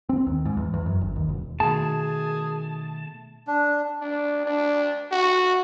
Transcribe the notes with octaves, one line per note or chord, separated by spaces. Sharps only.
C4
D#2
G#2
E2
E2
F#2
G1
D#2
E1
B2 D#3 A3 G#4 A5
D4
D4
D4
F#4